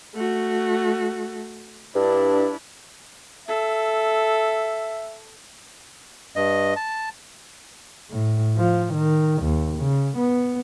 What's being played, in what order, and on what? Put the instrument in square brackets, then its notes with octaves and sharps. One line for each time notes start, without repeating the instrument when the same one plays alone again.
[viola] A3 F#4
[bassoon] G2 [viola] D4 E4
[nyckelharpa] A4 [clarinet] E5
[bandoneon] G2 D#5
A5
[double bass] A2
F3
D#3
D#2
C#3
B3